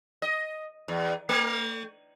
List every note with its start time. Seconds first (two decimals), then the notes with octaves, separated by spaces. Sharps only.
0.22 D#5
0.88 E2
1.29 A3